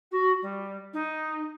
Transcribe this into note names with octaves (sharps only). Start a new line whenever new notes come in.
F#4
G3
D#4